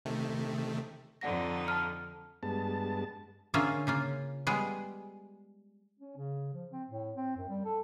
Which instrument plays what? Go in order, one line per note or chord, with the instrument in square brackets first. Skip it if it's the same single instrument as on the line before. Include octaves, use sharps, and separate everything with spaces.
[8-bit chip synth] C3 D#3 A3
[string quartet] F2 D3 D#4 [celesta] D5 F#5 A#6
[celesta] A5 F6
[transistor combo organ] G2 G#3 B3 A5
[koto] D3 A#3 C#4 F4 G#4 E5
C#3 A#3 F4
G3 G#3 B3 G#4
[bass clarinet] C#4
C#3
F3
C4
A2
C4
F#2
G3
A4